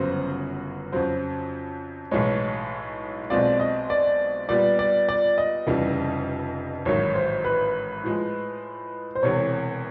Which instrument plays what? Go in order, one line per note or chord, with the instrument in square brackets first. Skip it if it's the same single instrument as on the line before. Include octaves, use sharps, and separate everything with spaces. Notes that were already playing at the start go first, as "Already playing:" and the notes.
Already playing: [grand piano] G1 F#2 C#3 F#3 B3 [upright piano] C5
[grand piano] F2 C#3 F#3 [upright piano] C5
[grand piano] B1 A2 E3 G#3 [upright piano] C#5
[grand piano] B1 B2 G#3 C4 F4 [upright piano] D5
[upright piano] D#5
D5
[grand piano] A#2 G3 B3 [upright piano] D5
[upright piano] D5
D5
D#5
[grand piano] F1 F2 C#3 E3 G3
[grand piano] A1 G#2 D#3 F#3 [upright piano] C#5
[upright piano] C5
B4
[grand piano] A2 F3 G#3
[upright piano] C5
[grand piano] E1 E2 C3 [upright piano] C#5